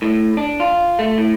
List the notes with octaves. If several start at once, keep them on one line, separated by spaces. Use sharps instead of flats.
A2
D4
F4
A3
A2